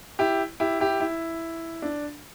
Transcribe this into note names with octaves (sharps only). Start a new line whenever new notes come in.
E4 G4
E4 G4
E4 G4
E4
D4